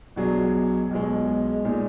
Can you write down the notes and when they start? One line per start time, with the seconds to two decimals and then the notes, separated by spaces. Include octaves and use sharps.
0.16 B1 B2 F#3 D4 G#4
0.91 B1 B2 G#3
1.65 A#2 G#3 D#4